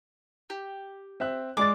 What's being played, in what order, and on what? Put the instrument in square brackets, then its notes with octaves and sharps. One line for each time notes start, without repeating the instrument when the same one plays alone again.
[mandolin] G4
[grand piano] C4 E5 F#6
[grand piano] G#3 D5 A6 [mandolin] D6